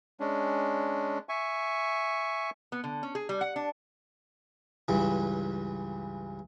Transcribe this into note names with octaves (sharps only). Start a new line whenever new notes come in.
G#3 C#4 D4
E5 G#5 C#6
B3
D3
C#4
G#4
G3
F#5
D4
C#2 G2 E3